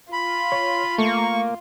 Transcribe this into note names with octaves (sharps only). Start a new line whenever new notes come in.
F4 B5
C#5
A3 A#3 C#6